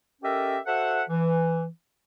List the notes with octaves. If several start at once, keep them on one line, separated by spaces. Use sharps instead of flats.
C#4 G4 A4 A#4 D#5 E5
F#4 A4 C5 E5 F#5
E3